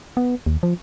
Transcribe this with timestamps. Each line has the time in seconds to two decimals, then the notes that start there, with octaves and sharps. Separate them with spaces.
0.17 B3
0.46 D#2
0.63 F3